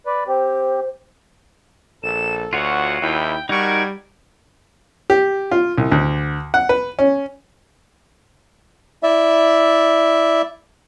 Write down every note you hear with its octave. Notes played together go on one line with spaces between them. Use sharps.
B4 D5
C4 G4 C5
A#1 A4 E7
D2 F4 F#4 C#5 F#5
D#2 E4 G5
G3 D#4 F#4 A#4 D#5 F#5 C#6 G#6
G4
F4
C2
D2
F#5
B4
C#4
E4 D5 E5